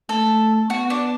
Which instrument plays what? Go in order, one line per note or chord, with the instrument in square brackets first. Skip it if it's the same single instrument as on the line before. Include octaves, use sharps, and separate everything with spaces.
[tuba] A3 [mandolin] A4
[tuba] B3 [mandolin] F#4
[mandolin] D4